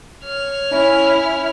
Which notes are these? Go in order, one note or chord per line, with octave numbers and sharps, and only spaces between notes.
C#5 F6
C#4 E4